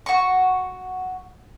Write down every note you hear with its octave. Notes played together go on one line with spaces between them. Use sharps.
F#4 C#6